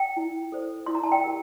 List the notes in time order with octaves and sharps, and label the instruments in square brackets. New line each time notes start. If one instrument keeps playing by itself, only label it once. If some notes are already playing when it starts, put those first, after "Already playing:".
Already playing: [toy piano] G5
E4
A4 C5
E4 C6
A#5
A5
G5
G4 A#4